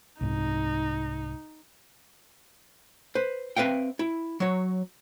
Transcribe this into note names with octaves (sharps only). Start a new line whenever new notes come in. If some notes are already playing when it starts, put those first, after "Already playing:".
C2 G#2 D#4
B4 C5
C4 B4 E5 F5 G5
E4
F#3 C#5